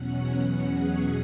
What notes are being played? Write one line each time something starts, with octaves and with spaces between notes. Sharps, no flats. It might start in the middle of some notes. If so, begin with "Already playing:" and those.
Already playing: E2 B2 F#3 C#4 F#5
F#5
G#4